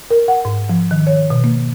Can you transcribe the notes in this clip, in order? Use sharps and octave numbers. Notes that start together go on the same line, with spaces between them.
A#4
F#5
G#2
F3
D#3
C#5
B2
A#3